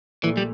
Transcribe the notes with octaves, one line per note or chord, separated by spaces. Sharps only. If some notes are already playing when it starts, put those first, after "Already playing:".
A#1 A#2 E3 A3
G3